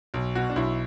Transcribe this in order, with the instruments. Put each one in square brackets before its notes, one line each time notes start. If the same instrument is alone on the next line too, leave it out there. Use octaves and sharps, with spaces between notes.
[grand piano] B1
B2 F#4
D4
B1 E4